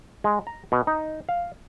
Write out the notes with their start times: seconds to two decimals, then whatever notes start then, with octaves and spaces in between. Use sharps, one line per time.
0.24 G#3
0.47 A#5
0.72 B2
0.87 D#4
1.29 F5